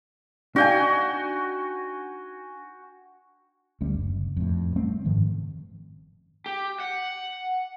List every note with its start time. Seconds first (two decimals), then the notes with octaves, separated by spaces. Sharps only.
0.56 D4 D#4 F#4 F5 G5 G#5
3.81 D2 G3 C#4
3.95 F#1
4.37 F2 A2
4.76 G3 A3 C4 C#4
5.05 F#1 G#2 D#3 F3
6.46 G4
6.80 F#5